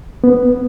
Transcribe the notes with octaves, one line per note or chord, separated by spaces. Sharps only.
B3